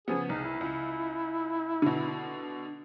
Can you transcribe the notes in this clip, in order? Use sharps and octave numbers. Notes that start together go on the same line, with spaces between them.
C#3 F3 B3 G#4
C2 D#4
E4
C#2
B2 D3